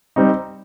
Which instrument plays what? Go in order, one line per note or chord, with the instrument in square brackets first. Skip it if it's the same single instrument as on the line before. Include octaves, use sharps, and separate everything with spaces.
[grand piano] G3 C4 D#4